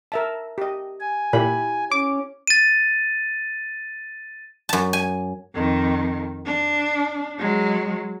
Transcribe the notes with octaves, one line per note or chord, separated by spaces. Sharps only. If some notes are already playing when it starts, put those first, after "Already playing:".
A#4 E5 A5
G4 D#5
G#5
A#2 E4 G4 B5
C#4 D6
A6 D#7
F#2 A5
G#5
F2 D#3
D4
F#3 G#3